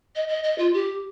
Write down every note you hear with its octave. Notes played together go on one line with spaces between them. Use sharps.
D#5
D#5
D#5
F4
G4